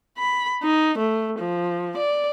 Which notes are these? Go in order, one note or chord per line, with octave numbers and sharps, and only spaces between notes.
B5
D#4
A3
F3
D5